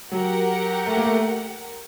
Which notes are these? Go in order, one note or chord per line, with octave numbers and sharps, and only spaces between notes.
F#3 G4 A#4 F#5
A3
A#3
A3